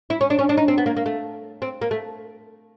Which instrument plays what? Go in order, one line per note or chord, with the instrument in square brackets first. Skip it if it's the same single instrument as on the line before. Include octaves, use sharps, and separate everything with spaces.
[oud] E4
C#4
D4
C#4
D4
D#4
C4
B3
A#3
A#3
A3
C4
A#3
A3